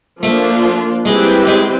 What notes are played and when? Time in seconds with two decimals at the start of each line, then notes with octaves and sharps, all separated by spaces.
0.23 F3 A3 A#3 D4 F4
1.05 G3 G#3 C4 E4 G4 B4
1.47 G#3